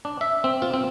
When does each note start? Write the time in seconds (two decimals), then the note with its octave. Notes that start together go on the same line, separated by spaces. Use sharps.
0.05 D4
0.21 E5
0.44 C4
0.62 F4
0.74 C4